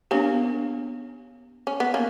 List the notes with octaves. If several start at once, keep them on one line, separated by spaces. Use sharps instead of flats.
A#3 B3 C#4 D4 G4
C#4
B3
A#3 C#4